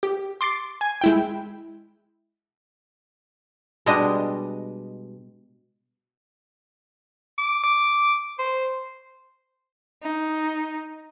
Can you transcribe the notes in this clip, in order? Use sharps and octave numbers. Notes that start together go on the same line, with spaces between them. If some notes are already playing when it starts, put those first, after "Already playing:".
G4
C6 D6 A6 C7
G#5 G#6
G#3 E4 G5
B2 G3 G#3 D4 D#5
D6
D6
C5
D#4